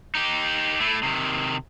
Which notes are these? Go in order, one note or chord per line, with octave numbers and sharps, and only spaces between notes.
D#4 G4
A3 E4
C3 D#3